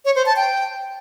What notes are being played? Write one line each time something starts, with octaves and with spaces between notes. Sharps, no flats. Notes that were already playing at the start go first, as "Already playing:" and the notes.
C#5
C5
A5
G5